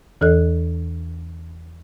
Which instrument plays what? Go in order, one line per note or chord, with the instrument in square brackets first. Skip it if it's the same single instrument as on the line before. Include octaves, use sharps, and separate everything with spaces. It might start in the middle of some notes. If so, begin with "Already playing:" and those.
[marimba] E2 E3 A4 D#5 F#6